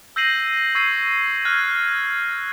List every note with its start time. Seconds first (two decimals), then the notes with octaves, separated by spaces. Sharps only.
0.16 E6 G6 A#6 C7 D#7 F#7
0.75 C#6 E6 G#6 C7 D#7
1.45 F6 F#6 G#6